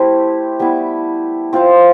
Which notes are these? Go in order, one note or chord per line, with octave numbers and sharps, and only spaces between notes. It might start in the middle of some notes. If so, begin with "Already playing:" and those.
Already playing: A3 C4 E4 G4
G3 B3 E4
C4 F4 C5 F5